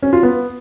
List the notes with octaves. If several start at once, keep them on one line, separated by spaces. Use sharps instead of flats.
C#4
F4
B3